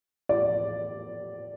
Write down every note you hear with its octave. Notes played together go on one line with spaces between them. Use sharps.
D5